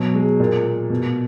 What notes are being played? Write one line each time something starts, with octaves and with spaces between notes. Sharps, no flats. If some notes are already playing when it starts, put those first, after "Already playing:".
Already playing: B2 F#3
G#3
A#2
A#3
B2